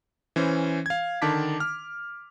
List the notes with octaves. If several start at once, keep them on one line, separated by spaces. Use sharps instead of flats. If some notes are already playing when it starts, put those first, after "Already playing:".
E3 C#4 C5
F5 G#6
D3 D#3 A5 D6 B6
F6